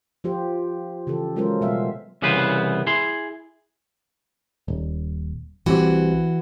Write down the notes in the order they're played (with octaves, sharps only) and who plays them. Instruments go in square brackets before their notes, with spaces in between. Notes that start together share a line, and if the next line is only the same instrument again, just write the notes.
[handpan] F3 F4 G4 C5
C#3 E3 G4 A4
F#3 G#3 C#4 F4 A#4 C5
B2 G3 B3 E5 F5
[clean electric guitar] C2 C#3 E3 B3 B4 C5
E4 G#4 C6
[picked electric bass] D#1
[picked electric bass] C2 C3 [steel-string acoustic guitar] E3 F#4